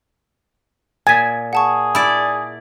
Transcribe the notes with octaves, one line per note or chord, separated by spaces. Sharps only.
A#2 G#5 A6 B6
G#4 F#5 A5 C#6
E4 D5